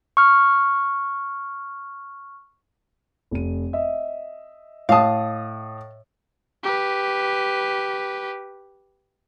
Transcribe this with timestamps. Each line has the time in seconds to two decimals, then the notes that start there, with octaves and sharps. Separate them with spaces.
0.17 C#6 F6
3.31 F1 D#7
3.73 D#5 E5
4.89 A2 F5 A5 D#6
6.63 G4 B4